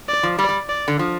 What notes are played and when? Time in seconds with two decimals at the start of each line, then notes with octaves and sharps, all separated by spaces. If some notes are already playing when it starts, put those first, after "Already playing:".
0.09 D5
0.23 F3
0.39 G3 D5
0.49 G3
0.69 D5
0.88 D3
0.99 F3